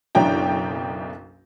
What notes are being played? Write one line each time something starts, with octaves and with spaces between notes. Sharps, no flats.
F#1 B1 D4 E4 G5 A#5